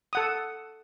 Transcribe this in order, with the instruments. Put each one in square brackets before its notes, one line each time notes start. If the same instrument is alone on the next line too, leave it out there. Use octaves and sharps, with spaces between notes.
[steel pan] A4 F#5 D#6